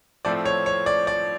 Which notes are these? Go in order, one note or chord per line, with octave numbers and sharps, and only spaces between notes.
A2 F3 A3 C4 D5
C#5
C#5
D5
D5